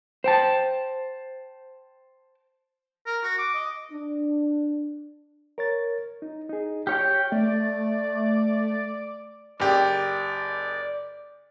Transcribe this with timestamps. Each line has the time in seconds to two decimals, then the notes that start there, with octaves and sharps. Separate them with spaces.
0.24 C5 G5 A5
3.06 A#4
3.23 F#4
3.38 D6
3.54 D#5
3.92 D4
5.58 A#4 C#5 A6
6.22 D#4
6.49 D#4 G#4
6.87 G4 C#5 G5 F6
7.32 A3 D5
9.60 F#1 G4 D5